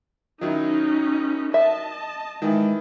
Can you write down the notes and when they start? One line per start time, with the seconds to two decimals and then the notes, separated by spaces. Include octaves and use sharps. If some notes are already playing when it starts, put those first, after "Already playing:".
0.41 D#3 F#3 C#4 D#4 E4
1.54 D#5 E5 A5
2.42 D#3 E3 G#3 E4